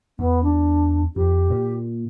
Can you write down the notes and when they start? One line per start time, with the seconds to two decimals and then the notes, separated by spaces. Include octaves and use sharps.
0.19 E2 B3
0.43 D4
1.16 F2 G4
1.50 A#2